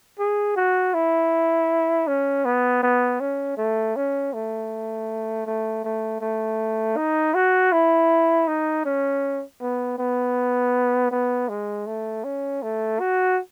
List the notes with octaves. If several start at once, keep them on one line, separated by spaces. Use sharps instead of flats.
G#4
F#4
E4
C#4
B3
B3
C#4
A3
C#4
A3
A3
A3
A3
D#4
F#4
E4
D#4
C#4
B3
B3
B3
G#3
A3
C#4
A3
F#4